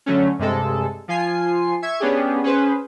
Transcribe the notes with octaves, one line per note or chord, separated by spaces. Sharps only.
D3 F#3 A3 C#4
G2 C3 G#3 A4
F3 F4 G#5 C7
E5 C#6 G#6
B3 C#4 D4 G4 G#4
C#4 G#4 B4 C5